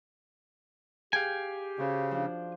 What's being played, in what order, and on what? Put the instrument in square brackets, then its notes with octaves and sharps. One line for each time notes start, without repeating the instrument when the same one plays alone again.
[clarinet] G4 [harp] G#4 [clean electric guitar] F5 G5 G#5
[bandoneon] C#3 [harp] C#4 F#4 C5
[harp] F3 D4